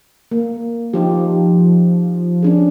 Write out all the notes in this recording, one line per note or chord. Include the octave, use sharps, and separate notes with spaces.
A#3
F3 D#4 F4 G4
C#4 D4 G#4